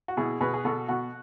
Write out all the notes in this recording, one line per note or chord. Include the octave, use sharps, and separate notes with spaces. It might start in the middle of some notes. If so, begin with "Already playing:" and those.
F#4
B2 E4 G#4
B2 G#4 B4
G#4
B2 F#4 A4
B2 F#4